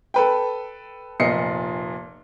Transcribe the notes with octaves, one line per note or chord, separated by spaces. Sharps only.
A4 B4 G5
F1 A#2 D#5 C7 C#7